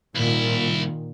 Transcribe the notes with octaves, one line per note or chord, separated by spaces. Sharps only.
C2 A#2 D#3 E4